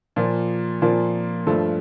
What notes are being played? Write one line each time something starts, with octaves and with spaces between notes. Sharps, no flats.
A#2 F3 A#3
A#2 F3 A#3
G2 F3 A3